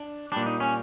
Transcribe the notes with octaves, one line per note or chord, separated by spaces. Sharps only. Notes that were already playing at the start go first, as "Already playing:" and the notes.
Already playing: D4
A#2 G3 D4
D#4
C#4